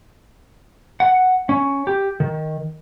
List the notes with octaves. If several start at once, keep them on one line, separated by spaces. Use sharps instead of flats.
F#5
C#4
G4
D#3